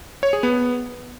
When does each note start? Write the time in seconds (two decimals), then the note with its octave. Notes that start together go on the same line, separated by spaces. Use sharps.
0.23 C#5
0.33 G#4
0.43 B3